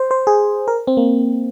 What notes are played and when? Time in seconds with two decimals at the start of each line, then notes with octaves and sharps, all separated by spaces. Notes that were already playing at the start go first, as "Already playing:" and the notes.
Already playing: C5
0.11 C5
0.27 G#4
0.68 A#4
0.87 C4
0.97 A#3